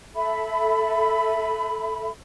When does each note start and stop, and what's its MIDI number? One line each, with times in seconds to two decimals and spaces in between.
0.16 2.09 69
0.16 2.09 76
0.16 2.09 83